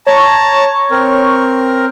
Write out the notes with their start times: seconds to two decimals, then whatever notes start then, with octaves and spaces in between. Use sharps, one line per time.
0.07 C#5 A5 A#5
0.91 C4 A#4